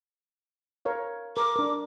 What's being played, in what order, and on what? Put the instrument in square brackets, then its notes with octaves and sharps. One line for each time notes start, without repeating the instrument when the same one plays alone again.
[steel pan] A#4 C#5 F5
[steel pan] A#4 [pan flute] D6
[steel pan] D4 A#4